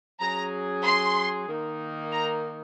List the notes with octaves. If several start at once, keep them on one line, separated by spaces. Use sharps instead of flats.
F#3 C#4 G#4 A#5
C6
D#3 A#3 D#4
A#5